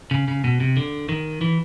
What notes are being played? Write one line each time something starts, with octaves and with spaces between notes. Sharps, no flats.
C#3
C#3
B2
C3
D3
D#3
E3